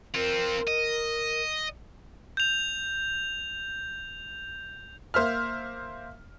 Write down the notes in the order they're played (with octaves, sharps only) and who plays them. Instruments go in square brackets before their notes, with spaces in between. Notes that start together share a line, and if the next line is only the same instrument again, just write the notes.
[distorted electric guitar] C4 F4 [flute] A#4
[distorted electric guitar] D#5
[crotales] G6 F7
[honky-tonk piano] A#3 C5 E5 F6